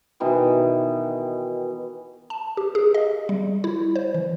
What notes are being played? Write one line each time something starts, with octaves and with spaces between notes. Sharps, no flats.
B2 D#3 E3 G5
A5
G4
G#4
D#5
G3
E4
C5
E3